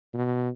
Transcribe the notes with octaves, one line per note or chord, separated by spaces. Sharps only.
B2